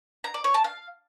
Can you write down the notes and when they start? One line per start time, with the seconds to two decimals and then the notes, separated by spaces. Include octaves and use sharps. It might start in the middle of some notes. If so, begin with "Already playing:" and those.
0.24 A#5
0.34 D5
0.44 C#5
0.54 A5
0.64 F5